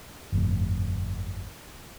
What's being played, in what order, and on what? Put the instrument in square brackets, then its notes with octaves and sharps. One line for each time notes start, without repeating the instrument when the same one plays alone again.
[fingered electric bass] G1 F2 A2